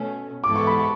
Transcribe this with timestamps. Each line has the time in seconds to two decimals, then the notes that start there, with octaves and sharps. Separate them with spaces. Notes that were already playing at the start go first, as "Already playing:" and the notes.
Already playing: B2 A3 C#4
0.44 G#2 E3 B3 E4 A4 D6
0.55 C#6
0.67 B5
0.79 C#6